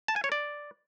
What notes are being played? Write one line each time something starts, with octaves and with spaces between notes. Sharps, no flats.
A5
G#5
C#5
D5